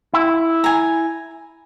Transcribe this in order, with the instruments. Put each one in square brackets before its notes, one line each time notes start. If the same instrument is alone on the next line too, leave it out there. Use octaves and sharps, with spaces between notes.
[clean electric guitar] E4
[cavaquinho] G#5 A#5